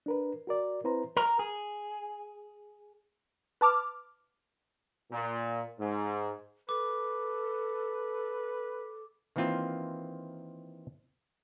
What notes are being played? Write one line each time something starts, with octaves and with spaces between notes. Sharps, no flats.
D4 A#4 B4
F#4 A#4 D5
C4 E4 B4 C5 A#5
A#4
G#4
B4 A5 D6 F6
A#2
G#2
A4 B4 D6
D#3 E3 A#3 C4 F4